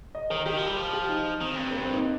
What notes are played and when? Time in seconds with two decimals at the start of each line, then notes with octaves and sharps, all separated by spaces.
0.15 D#5
0.30 D#3 A#4
0.46 D#3 G4
0.57 F3
0.67 G3
0.77 F3
0.93 G4
1.09 D#4
1.40 D#3 C4
1.51 F2
1.56 G2
1.71 A#3
1.81 C4
1.93 D#4